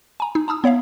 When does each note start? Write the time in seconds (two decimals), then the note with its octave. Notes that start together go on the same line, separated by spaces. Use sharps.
0.20 G#5 A#5
0.35 D#4
0.48 A5 A#5 D#6 E6
0.64 B3 C#5 E5 F5